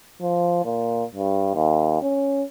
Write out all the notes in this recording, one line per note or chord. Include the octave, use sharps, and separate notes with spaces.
F3
A#2
G2
D#2
C#4